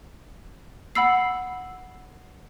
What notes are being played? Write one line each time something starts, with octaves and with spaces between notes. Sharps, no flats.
F#5 B5 E6 C7